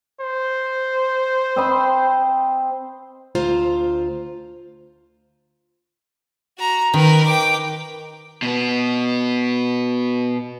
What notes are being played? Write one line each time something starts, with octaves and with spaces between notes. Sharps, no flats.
C5
C4 D#5 B5
D2 F4 C5 A#5
F#4 A#5
D#3 A#4 B4
G5 D6
B2 B3